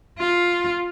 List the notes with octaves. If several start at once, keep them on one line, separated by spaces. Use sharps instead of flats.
F4